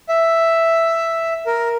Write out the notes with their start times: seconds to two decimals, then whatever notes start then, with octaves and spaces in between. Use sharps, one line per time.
0.09 E5
1.46 A#4